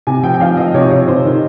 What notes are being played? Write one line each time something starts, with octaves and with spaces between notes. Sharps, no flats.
C3 G#5
F3 G5
G5
F3 F5
F3 D#5
C3 C#5
C3 C#5
C3 C5
D#3